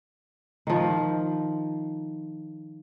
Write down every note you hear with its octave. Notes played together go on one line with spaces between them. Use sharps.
D#3 F3